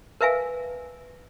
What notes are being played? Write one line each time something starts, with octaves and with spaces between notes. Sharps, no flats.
A#4 B4 E5 F5 G#5